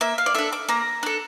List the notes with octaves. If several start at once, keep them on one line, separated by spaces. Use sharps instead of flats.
A#3 E5
F5
D5
D4 A4 E5
D6
A#3 A#5
D4 A4